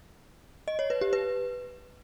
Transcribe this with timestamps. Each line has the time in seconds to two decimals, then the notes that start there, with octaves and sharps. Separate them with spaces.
0.68 D#5
0.79 C#5
0.90 B4
1.01 G4
1.13 B4